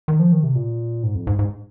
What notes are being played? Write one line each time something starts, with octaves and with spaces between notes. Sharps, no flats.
D#3
F3
D#3
C3
A#2
G#2
F2
G#2
G#2